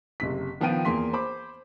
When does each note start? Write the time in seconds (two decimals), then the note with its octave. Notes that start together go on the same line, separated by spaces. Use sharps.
0.20 F#1 C3 B6
0.60 D#3 F3 B3 F4 G5 D#7
0.85 E2 A#3 C6 B6
1.13 C5 B5 D6